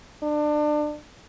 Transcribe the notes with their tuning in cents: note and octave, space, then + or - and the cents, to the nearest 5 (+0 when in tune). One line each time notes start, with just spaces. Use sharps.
D4 +30